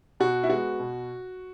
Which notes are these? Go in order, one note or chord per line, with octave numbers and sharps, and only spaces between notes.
B2 F#4
E4
G#3 B3 F#4
B2